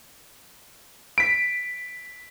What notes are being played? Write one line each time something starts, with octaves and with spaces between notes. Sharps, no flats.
B6 D7